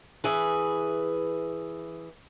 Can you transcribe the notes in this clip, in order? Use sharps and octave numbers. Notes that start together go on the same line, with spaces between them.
E3 G#4 B4